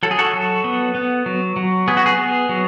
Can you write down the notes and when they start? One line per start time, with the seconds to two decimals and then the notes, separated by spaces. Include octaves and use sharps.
0.03 F#3 A4
0.11 G#4
0.19 F#4 A4
0.34 F#3
0.64 B3
0.95 B3
1.26 F#3
1.56 F#3
1.88 B3 G#4
1.97 F#4
2.06 G#4
2.18 B3
2.49 F#3